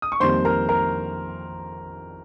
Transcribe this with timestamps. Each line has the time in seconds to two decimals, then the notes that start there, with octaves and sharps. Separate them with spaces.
0.02 D#6
0.12 C#6
0.20 F2 D#3 G3 A#3 C5 C6
0.45 A#4 A#5
0.69 A#4 A#5